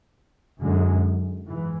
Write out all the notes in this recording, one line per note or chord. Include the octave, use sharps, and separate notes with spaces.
F#2 D3 G#3
G#2 E3